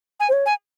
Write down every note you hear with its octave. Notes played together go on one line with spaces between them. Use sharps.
G#5
C5
C#5
G#5